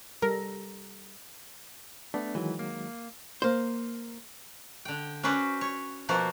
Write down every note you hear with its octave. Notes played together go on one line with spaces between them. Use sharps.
G3 A4 A#4 A#5
A3 B3 D4
D#3 E3 F#3 G#3
A#3
A#3 C5
D3 G5
C#4 F#4 B4 C5 D5
C#5
B2 F3 A#3 F#4 C5